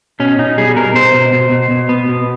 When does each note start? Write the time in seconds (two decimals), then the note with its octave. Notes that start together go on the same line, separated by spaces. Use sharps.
0.20 B2 C#4
0.39 B2 D#4
0.58 G3 G#4
0.76 B2 A#4
0.95 B2 C5
1.14 B2
1.33 B2
1.52 B2
1.71 B2
1.89 B3
2.09 B2